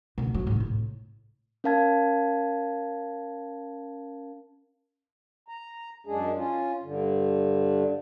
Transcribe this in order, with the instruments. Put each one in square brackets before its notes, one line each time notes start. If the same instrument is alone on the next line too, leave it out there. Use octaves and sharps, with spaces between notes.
[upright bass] B2 D3
F#3
G#2 C3
A2
[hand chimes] C#4 A#4 F5 A5 G#6
[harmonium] A#5
F#2 G#3 D4 G#4
C#4 F4
G2 D3